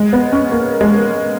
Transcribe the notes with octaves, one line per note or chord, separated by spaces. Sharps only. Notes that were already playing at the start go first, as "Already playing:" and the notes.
Already playing: G#3
B3
C#4
A#3
G#3